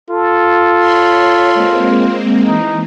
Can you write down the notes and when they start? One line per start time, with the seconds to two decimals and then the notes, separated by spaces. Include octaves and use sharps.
0.10 F4 A4
0.79 C#5 B5 C6
1.54 G#3 A#3 C4
2.45 E3 D#4